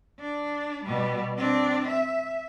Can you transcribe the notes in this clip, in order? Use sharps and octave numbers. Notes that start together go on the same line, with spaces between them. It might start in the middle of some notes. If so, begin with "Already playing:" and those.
D4
B2 G3
C4 D4
E5